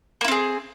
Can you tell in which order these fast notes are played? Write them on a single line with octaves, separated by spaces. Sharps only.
A#3 E4 C4 G#4